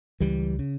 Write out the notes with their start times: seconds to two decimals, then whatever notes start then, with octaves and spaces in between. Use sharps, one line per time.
0.20 C#2 E3 G3
0.59 C#3